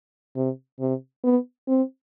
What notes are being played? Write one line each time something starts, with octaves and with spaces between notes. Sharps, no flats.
C3
C3
B3
C4